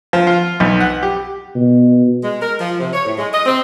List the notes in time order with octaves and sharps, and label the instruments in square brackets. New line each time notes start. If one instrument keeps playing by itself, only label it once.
[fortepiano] F3
F4
B1
F#5
G4
[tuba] B2
[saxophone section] G#3
A#4
F3
C3
C#5
A2
G#3
D#5
C4